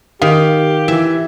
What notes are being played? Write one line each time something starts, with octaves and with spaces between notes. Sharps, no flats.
D#3 G4 F5
E3 E5